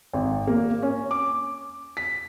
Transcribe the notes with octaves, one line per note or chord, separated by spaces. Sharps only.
G#1
A#3
C#4
D6
B6